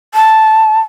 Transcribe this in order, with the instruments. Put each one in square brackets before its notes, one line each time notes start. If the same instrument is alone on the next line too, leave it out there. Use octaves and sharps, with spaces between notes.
[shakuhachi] A5